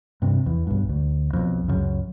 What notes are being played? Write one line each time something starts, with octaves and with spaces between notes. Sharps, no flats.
G2 C3
E2
B1 G2
D2
B1 F2
C#2 F#2 C#3